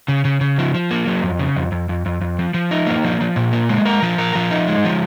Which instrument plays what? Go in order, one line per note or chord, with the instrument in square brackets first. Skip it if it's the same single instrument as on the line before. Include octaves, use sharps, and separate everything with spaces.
[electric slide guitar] C#3
C#3
C#3
F3
F3
A#3
F#3
F2
C#3
F2
F2
F2
F2
F2
F3
F3
D#4
A#3
F3
F3
A#2
A#3
G#3
A#4
F3
A#4
F3
D#4
G#3
F3